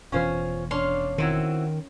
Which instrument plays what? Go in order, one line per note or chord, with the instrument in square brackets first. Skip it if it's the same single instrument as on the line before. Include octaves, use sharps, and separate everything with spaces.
[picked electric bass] F1 B2 E3 [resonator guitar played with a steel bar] C#4 F4 C5
[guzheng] C#4 F5 C6 [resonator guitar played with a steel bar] D4
[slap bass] D#3 [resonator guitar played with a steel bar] C4 E4 F#4